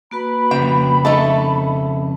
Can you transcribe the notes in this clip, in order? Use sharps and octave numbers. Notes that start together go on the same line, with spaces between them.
A#3 F#4 B4 B5
F2 C#3 G5
A3 D#4 A4 E5 A5